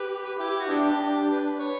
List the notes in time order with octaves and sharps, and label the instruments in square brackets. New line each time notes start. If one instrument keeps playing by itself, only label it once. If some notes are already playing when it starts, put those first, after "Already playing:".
Already playing: [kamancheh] G4 [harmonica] B4
[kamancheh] E4 [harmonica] G4
[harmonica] G4
F#4
[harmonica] B3 E4 G4 [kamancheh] D4
[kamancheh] D4
[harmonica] B4
C#5